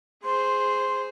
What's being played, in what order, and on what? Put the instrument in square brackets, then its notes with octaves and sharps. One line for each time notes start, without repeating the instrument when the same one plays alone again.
[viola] G#4 C5 [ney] C6